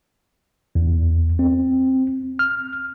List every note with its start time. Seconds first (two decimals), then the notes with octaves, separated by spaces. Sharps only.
0.75 E2
1.39 C4
2.39 F6